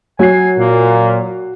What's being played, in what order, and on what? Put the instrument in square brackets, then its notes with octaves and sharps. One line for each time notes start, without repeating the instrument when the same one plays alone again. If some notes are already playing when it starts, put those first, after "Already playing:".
[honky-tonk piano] F#3 C7 [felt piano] F#4 [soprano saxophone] G#5
[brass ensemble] A#2 [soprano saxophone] A#3